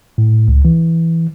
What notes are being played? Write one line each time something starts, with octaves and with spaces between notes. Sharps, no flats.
A2
C#2
E3